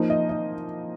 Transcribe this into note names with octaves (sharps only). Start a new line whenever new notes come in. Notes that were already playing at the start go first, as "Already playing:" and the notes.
Already playing: F3 A#3 D#4 C5
D#5
D#5